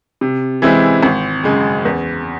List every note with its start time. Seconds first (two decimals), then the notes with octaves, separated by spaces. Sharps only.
0.21 C3
0.62 E3 G#3 C4 E4
1.03 G#1
1.44 F#2 C#3 G#3
1.85 E2